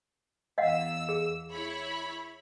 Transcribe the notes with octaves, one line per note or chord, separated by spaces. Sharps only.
E2 D#5 F5 F#5 E6
G#4
E4 C#5 B5